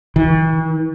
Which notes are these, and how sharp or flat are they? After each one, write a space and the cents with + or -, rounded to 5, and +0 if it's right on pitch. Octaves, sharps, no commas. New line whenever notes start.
E3 -45